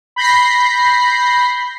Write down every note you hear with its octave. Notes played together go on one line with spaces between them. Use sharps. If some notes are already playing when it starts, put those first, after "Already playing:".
B5 G6 A#6 C7